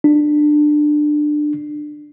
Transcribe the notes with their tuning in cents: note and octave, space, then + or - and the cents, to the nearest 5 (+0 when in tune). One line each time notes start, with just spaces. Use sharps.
D4 +20